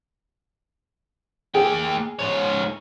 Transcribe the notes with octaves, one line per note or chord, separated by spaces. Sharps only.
A#3 G#4 G5
G#2 C#5